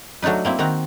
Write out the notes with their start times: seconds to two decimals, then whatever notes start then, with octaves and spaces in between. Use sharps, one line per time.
0.22 F#3 A3 D4 D#4 B4
0.45 A#3 C4 E4
0.59 D#3 C4 F#4 A#5